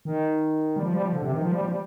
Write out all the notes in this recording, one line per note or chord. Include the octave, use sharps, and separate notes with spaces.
D#3
G3
F3
G3
F3
D3
C3
D#3
F3
G3
F3
G3